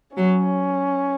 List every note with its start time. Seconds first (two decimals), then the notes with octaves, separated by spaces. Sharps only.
0.17 F#3 C#4